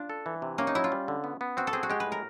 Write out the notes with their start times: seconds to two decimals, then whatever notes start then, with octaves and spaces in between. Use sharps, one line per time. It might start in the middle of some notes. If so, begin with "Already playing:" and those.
Already playing: D4 F4
0.10 A4
0.26 E3
0.42 C3
0.58 A#3 C#4
0.67 D#4
0.75 F#3 E4
0.84 F4
0.92 G3
1.08 D3
1.24 B3
1.41 B3
1.57 C4 F#4
1.67 A4
1.73 C4 G#4
1.83 F#4
1.90 G#3 G4
2.00 B4
2.06 A2
2.12 A#4